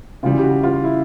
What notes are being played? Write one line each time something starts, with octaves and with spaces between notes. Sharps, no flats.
C#3 E3 G3 F4
G4
F#4
F4
E4